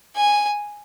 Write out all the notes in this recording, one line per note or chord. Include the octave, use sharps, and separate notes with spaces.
G#5